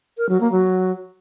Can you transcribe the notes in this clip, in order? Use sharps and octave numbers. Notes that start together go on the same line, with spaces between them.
A#4
F#3
A#3
F#3